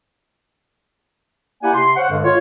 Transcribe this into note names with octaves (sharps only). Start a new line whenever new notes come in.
A#3 E4 G4 D5 F#5 G#5
C3 C6
C5 C#5 F5 F#5
G2 D3 G#3
F4 C#5